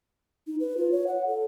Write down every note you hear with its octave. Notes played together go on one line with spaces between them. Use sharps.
D#4
B4
F4
C#5
F#5
A4